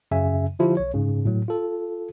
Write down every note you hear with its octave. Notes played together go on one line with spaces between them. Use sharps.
F#2 C#3 E5 G#5
D3 F3 E4 F4 G4
B1 C#5
G#2 C#3
A2 F#3
F4 A4